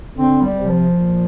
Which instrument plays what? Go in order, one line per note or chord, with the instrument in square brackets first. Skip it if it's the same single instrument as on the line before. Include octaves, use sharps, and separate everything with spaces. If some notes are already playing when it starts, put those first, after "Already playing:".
[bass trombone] D3 [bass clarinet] C4
[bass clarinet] G3
[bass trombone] C3
[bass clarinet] F3
[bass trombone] A#2